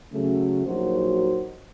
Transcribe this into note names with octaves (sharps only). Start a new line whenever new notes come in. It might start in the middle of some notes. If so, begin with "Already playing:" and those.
C#3 F#3 A3
A#1 F#3 D#4 F#4 A#4 C5